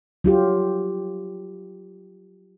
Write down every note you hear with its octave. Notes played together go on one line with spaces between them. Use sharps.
F#3 F4 G4